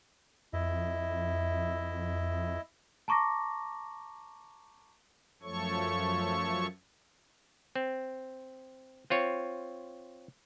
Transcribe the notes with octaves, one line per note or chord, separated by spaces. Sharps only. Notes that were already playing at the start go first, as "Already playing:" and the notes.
F2 E4 D#5 E5
A5 A#5 C#6 D6 A#6
F#2 F3 A3 A4 C#5 C#6
C4
C4 F4 C#5